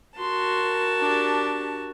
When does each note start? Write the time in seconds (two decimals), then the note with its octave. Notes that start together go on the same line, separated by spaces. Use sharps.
0.18 F#4 A#4 A5 C6
1.00 D4 G4